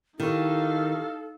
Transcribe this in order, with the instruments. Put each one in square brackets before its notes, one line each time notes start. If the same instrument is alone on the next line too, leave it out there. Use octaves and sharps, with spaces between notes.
[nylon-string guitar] D#3 [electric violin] D#4 F5 [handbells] E4 G4 C#6 [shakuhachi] A4